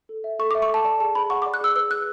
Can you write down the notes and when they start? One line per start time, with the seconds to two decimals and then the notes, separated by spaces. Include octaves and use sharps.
0.09 A4
0.24 E5
0.39 A4 C#6
0.51 D6
0.55 E5
0.62 C#6
0.69 A4 A5
0.85 D5 A5
1.00 G#4 A5
1.15 G#4 B5
1.30 F#5 C#6
1.42 D6
1.46 D5
1.54 F#6
1.61 G#4 E6
1.76 B4 E6
1.90 G#4 F#6